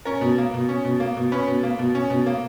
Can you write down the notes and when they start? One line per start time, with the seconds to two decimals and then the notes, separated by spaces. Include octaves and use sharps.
0.05 C#4 A#4
0.21 B2
0.38 A#3
0.54 B2
0.69 C#4
0.85 B2
1.00 A#3
1.17 B2
1.32 C#4 B4
1.47 B2
1.63 A#3
1.79 B2
1.95 C#4
2.10 B2
2.26 A#3